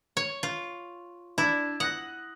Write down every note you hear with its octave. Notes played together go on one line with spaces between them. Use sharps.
C#5
F4
D4 E4 D5
F#5 D#6 F#6 A#6